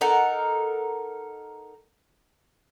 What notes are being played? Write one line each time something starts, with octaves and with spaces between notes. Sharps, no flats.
D#4 A4 A#4 F#5